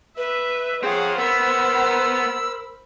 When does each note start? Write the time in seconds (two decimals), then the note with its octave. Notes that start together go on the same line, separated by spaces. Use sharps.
0.17 B4 E5
0.83 C4 F4 G#4 C#5 F#5
1.18 B3 A#4 C5 B5 E6